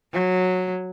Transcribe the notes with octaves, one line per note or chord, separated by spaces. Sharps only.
F#3